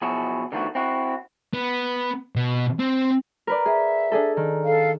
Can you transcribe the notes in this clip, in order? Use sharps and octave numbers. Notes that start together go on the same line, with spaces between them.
B2 F3 F#3 E4 F#4 G#4
D3 D#3 F3 A3 B3 F#4
C4 E4 F#4
B3
B2
C4
A#4 B4 D5
G#4 E5
D4 G#4 A4
D#3
A4 F5